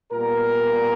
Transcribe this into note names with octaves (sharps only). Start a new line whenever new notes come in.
A#2 G3 B3 A#4